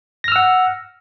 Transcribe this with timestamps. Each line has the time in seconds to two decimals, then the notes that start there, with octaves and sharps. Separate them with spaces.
0.24 A#6
0.28 F6
0.32 E6
0.36 F#5